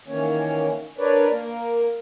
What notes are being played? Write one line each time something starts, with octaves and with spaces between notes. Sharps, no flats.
D#3 E3 A#3 C#4 C#5
D4 A#4 B4 C#5 D5
A#3 A#4